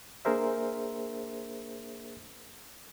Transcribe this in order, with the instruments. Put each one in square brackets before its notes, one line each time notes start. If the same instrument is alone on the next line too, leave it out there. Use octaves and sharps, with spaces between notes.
[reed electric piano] A#3 D4 G#4 A#4 C5 E5